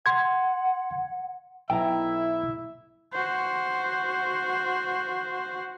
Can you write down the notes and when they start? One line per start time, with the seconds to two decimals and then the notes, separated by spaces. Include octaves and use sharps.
0.06 F#5 C6 G#6
1.70 B1 E4 E5 G5 A5 A#5
3.13 F#4 C5